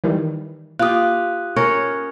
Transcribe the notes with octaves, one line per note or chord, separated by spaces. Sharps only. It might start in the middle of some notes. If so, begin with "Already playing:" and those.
D#3 E3 G3
A#3 F4 G4 D#6 F#6
C#4 A#4 C#5